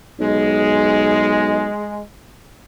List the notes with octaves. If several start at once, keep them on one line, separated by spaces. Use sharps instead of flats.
B1 G#3